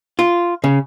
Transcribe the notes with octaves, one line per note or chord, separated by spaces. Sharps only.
F4
C#3